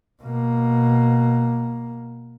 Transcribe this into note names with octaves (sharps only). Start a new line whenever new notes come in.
B2 A#3